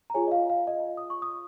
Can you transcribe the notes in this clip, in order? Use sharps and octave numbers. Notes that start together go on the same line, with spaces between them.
A#5
F4 G#4 C#5 G#5
D#5
F5
F5
D#5
D#6
C#6
D#6